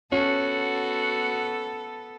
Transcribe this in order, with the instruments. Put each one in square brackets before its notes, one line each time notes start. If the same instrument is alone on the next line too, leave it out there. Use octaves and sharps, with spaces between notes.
[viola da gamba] B3 A4 [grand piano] C#4 [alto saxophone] F#4